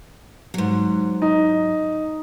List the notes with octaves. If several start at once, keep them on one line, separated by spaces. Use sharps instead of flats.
G#2 F#3
D#4